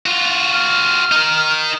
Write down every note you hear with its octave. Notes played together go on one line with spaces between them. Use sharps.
F4 F#4
F6
D#4 A#4